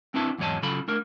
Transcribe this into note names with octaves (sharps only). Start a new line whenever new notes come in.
C4 D4 E4 B4 E5 A5
E2 G#2 F#3 C#5 D#5 A5
C#3 F#3 F4 A4 B5
A3 D4 A#4